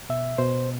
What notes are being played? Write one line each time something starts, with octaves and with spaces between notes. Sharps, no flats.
B2 E5
B2 C5